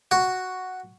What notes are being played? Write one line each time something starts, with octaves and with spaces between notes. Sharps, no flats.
F#4